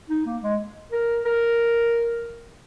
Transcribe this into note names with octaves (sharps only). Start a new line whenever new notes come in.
D#4
A#3
G#3
A#4
A#4